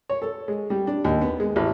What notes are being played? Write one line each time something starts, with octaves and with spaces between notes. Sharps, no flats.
C#5
A4
G#3
G3
D4
D#2
B3
G#3
A1